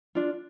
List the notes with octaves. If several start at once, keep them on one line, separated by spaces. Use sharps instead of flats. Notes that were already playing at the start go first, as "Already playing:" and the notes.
D4 F4